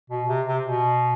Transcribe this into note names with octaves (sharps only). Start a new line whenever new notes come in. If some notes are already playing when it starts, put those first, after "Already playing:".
B2
C3
C3
B2